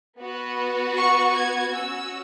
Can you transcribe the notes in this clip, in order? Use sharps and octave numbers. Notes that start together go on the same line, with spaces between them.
B3 F#4
C#6
G#6
C#4 F#4 E6